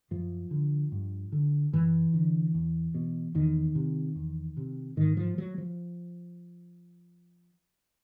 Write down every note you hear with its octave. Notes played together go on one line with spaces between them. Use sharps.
F#2 F3
D3
G2
D3
F#2 E3
D3
E2
B2
E2 D#3
C3
E2
C3
G#2 D#3
F3
F#3
F3